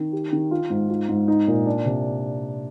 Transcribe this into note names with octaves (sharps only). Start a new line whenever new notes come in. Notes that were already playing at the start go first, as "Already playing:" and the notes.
Already playing: D#3
G4
D#3
F4
G#2
F4
G#2
D#4
A#2
D4
C3